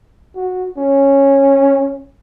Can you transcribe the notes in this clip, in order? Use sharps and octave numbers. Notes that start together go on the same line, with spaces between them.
F#4
C#4